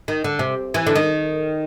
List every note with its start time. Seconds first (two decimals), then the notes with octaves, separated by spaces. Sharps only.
0.08 D#3
0.24 D3
0.39 C3
0.74 E3
0.87 D3
0.95 D#3